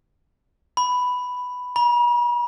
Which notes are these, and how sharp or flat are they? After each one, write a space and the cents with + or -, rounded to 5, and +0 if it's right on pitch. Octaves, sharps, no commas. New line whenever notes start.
B5 +5
B5 -45